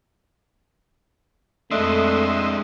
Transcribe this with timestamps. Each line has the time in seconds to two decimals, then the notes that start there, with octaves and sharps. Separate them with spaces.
1.72 F2 G#3 A3 D4 D#5 E5 C6